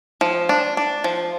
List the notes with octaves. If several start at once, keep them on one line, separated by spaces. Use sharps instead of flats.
F3
D4
D4
F3